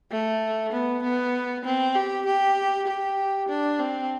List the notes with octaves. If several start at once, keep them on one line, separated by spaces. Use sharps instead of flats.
A3
B3
B3
C4
G4
G4
G4
D4
C4